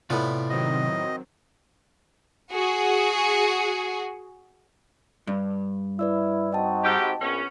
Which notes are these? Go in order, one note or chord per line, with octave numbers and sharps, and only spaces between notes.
A2 C3 B3 F4 D5
D#3 F#3 C4 D#5
F#4 G#4
G2
E4 B4 D5 E6
C4 D#4 F#4 D#5 G5 A5
G#2 G4
A#1 B3 C#4